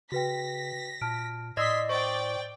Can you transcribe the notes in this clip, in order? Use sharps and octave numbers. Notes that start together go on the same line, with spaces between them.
C#3 F#4 B4 G5 A#6 B6
A#2 A5 F6 D7
A2 D5 D#5 C6 D#6 E6 G#6 B6
C5 D5 G5 C#6